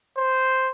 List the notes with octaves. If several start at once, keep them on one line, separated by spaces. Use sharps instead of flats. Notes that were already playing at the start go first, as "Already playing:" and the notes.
C5